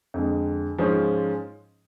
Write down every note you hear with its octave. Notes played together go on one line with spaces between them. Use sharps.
F2 D3 G#3
G#2 F3 G#3 C#4 F4